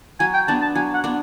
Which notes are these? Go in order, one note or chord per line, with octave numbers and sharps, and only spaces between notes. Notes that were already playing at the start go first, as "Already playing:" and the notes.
F#3 G#5
G5
B3 D4 A5
A5
F#3 G#5
F#5
B3 D4